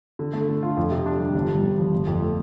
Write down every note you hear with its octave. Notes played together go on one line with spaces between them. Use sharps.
D3
A3
D3
F4
F2
C3
D4
G3
G1
G2
G1
F3
G1
F2
A3